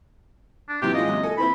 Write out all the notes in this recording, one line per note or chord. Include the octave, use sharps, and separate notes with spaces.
D4
C3 E3 F#3 G4
G#3 C#4 F4 D#5
C3 F#3
A4 G#5
E3 C4 E4 B5